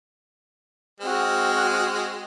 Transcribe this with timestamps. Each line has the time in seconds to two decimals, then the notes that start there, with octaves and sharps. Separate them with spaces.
1.01 G#3 C4 F#4 F6